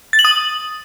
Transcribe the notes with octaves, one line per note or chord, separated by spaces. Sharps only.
A6
F#7
D#6